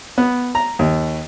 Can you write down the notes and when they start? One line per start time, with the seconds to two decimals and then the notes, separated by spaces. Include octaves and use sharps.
0.18 B3
0.55 A#5
0.79 D#2